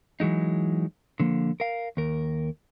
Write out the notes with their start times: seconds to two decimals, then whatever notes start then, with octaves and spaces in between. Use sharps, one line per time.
0.20 E3 F#3 G#3 D#4
1.20 D3 F3 A#3
1.60 A#4 F5
1.97 D#2 A#4